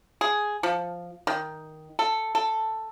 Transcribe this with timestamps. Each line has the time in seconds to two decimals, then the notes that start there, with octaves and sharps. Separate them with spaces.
0.21 G#4
0.63 F3
1.27 D#3
1.99 A4
2.35 A4